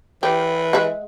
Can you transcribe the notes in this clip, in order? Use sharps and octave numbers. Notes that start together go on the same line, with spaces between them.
E3 G4
G#3 E5 F#5